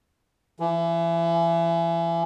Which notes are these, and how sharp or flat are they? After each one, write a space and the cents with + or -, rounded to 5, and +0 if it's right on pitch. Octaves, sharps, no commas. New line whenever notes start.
E3 +30